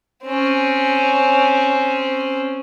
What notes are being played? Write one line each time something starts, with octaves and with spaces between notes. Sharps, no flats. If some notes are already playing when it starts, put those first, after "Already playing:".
C4 C#4